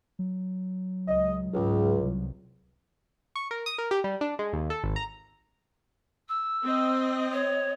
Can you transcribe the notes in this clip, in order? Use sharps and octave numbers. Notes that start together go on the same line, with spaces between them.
F#3
C#2 D#5
C#2 G#2
C2
C#6
A#4
D#6
A#4
G4
G3
D4
G#3
D#2
A4
G#1
A#5
E6
C4 D#5
C#5